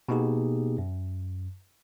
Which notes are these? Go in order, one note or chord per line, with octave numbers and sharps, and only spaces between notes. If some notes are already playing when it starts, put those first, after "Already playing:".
B2 A#3 B3 D#4 G4 G#4
F#2